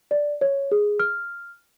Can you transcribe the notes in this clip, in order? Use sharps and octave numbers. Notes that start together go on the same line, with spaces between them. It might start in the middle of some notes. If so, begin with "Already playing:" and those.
D5
C#5
G#4
F6